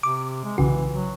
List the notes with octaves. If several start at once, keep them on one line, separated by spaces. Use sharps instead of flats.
C3 D6
G#3
B1 C#3 E3 F#4
F#3